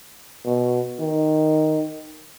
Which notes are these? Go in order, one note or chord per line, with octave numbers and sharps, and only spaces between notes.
B2
D#3